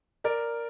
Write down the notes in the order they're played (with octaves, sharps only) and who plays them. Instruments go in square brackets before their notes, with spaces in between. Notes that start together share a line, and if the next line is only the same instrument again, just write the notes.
[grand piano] A#4 D5